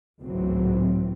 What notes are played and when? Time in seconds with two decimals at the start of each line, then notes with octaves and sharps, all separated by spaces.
0.20 G#1 C#2 A2 E3 F#3 C4